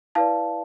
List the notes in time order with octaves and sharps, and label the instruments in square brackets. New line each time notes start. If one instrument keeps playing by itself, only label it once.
[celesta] E4 B4 D5 F5 A5